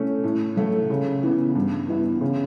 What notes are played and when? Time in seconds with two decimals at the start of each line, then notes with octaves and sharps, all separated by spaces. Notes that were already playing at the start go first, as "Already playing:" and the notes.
Already playing: E3 A3 C#4
0.24 A2
0.57 F#3 A3
0.90 C#3
1.23 E3 B3
1.55 G2
1.89 E3 B3 E4
2.21 C#3